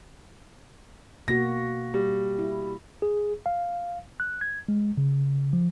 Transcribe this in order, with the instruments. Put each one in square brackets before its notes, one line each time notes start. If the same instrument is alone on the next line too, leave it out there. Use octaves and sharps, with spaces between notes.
[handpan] B2 A#3 F#4 [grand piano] A#6
[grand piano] G3
[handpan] E4
[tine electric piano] G#4
F5
F#6
G#6
G#3
C#3
F3